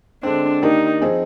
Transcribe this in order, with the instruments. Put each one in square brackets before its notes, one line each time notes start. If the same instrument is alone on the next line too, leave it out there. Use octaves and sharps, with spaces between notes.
[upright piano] D3 G#3 C4 [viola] D4
[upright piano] D#3 A#3 D4 G4 A#4 [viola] D#4
[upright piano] F3 C4 D#4 G#4